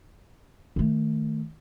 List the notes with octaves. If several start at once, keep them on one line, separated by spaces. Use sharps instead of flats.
D#3 A3